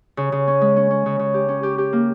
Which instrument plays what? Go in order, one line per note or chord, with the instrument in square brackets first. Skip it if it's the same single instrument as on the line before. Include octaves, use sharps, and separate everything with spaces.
[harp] C#3
C#3
C#4
G#3
C#4
C#4
C#3
C#3
G4
C#4
G4
G4
A#3